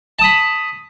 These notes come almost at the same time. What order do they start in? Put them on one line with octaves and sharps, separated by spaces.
A5 D#6 B5